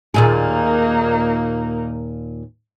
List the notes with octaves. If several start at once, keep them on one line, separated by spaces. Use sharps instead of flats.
D#2 A#2 A#3 D#4 G#4